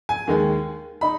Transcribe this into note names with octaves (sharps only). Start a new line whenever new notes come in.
G#5
D#2 D#3 G#3
D#4 B5